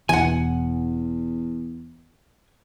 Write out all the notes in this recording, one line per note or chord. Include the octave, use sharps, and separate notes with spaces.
E1 B1 E2 E3 F#5 G#5